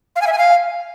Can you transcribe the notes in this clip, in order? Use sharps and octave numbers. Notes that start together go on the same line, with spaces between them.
F5
G#5
E5
G#5
F5